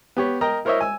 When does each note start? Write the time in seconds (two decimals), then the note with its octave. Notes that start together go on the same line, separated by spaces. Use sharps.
0.17 B3 G4 C#5
0.41 A#4 D#5 G5 A#5
0.65 E4 A#4 C5 C#5 D#5 E5
0.80 G#5 E6